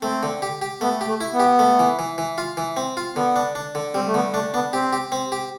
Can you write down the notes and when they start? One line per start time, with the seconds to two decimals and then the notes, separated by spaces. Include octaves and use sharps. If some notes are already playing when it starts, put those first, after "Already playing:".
0.02 A3 C4
0.23 D3
0.42 G4
0.62 G4
0.81 A3 B3
1.01 G4
1.07 A3
1.21 E4
1.33 B3
1.40 G4
1.59 A3
1.79 E3
1.99 E3
2.18 E3
2.38 F4
2.57 E3
2.77 C4
2.97 F4
3.16 D3 B3
3.36 D4
3.55 D4
3.75 D3
3.94 G3 C4
4.07 A3
4.14 D3 B3
4.34 A3 D4
4.54 B3 D4
4.73 C4 G4
4.93 G4
5.12 C4
5.32 G4